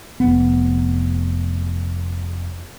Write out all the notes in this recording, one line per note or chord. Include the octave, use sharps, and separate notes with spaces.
F1 B3